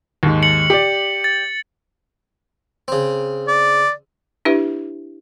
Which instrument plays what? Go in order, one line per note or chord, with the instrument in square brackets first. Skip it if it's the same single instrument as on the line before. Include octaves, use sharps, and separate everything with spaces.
[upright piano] D#2 G#2
[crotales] C#7 F#7
[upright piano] G4 D5
[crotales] A6
[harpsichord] C#3 C4
[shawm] D5
[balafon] D4 E4 G4 B4 E5